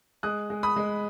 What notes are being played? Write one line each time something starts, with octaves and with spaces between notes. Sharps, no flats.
G#3 D#6 F#6
G#3
B5 D#6
G#3